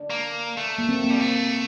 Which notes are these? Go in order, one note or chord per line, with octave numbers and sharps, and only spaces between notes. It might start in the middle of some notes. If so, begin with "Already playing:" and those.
Already playing: D4
A#3
A3
A#3
C4
A#3
G3
A3 C4